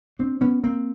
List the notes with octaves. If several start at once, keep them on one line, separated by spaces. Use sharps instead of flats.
C4 D4
B3 C#4
A#3 C4